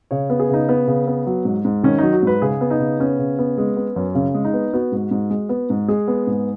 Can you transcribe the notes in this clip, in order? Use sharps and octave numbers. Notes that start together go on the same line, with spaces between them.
C#3 C#5
B3
G#4
C#3 D#4
B3
C#3
B3
F#3
G#2
G#2
D#3 C#4
F#3 D#4
F#4
G#2 B4
C#3 G#4
B3
D#4
C#3
B3 C#4
C#3
B3
G#3
B3
F#2
C#3 C#4
G#3
D#4
B3
B3 F#4
G#2
G#2
G#3
B3
G#2
G#3 G#4
B3
G#2